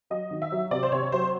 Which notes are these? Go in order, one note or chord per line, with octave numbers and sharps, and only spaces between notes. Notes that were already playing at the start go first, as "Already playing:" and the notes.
F#3 D#5
D#3
E5
F#3
C3 D5
C5
C3 C#5
F#3 C5